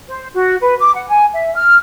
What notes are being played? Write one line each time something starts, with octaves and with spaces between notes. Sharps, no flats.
C5
F#4
B4
D6
F#5
G#5
E5
F6